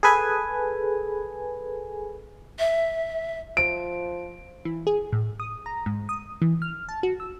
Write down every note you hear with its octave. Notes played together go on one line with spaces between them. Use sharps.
G#4 A4 B4 G#5
E5
F3 D7
E3
G#4
A2
D#6
A#5
G#2
D#6
E3
F6
A5
F#4
E6